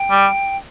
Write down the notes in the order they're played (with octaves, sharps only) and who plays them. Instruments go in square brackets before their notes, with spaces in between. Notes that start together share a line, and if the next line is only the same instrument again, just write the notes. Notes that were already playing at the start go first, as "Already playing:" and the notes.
Already playing: [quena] G5
[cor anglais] G3